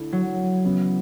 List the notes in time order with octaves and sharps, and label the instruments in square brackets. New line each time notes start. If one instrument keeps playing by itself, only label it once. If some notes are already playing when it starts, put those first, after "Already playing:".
Already playing: [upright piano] D3 A3 E4
[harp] F#3
[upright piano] C#3 E3 B3 E4